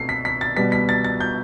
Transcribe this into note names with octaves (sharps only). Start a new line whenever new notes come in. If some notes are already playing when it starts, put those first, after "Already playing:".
Already playing: B2 A3 C4 C7
B6
B6
A6
B2 G3 B3 B6
B6
A6
A6
G6